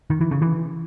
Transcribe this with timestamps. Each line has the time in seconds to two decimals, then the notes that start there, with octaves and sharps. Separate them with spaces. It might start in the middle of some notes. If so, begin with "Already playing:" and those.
0.10 D#3
0.21 E3
0.31 C#3
0.42 E3